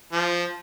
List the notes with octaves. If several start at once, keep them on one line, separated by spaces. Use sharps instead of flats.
F3